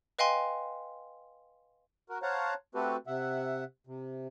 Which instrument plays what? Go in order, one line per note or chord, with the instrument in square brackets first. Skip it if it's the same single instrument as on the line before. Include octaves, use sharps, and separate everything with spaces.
[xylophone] B4 D#5 F5 G5 G#5 C6
[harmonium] F#4 A#4
C5 C#5 F5 F#5 A5 A#5
A3 C4 F#4 G4 A4 B4
C3 E5 F#5
C3